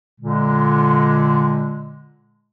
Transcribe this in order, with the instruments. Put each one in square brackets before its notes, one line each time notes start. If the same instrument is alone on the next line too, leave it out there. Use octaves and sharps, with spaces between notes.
[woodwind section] A#2 D3 G#3